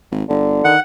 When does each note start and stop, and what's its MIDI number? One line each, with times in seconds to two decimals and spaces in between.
0.11 0.23 32
0.29 0.61 31
0.29 0.74 50
0.64 0.77 51
0.64 0.80 78